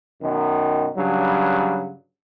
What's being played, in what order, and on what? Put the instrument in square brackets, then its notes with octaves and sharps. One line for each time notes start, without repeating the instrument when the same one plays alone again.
[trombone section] F#2 B2 D#3
G2 C#3 F#3